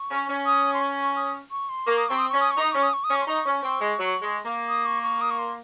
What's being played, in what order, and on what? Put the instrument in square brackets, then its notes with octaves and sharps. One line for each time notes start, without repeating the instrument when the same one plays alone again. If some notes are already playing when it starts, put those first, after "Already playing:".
Already playing: [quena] C#6
[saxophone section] C#4
C#4
[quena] D#6
C6
C#6
D#6
C#6
C6
[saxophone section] A#3 [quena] C#6
[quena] D#6
[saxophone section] C4 [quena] C#6
[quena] D#6
[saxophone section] C#4 [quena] C#6
[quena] D#6
C#6
[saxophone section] D#4 [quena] D#6
[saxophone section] C#4 [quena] C#6
[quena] D#6
C#6
D#6
[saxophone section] C#4
[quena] C#6
C6
[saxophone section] D#4 [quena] C#6
[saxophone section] C#4
C4
G#3
F#3
G#3
A#3
[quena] D#6
C#6
C#6
D#6
C#6
C6